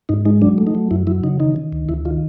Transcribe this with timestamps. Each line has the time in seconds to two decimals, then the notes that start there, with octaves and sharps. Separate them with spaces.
0.09 G#2 D#4
0.25 G#3 D#4
0.42 F#3 D4
0.58 A3
0.67 D#4
0.75 F#3
0.91 F#2 E4
1.07 F#3 E4
1.23 C#3 D#4
1.40 D#3 D#4
1.56 D#3
1.73 D2
1.89 D2 E4
2.05 D#3 F4